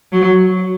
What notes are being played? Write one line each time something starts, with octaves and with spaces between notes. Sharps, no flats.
F#3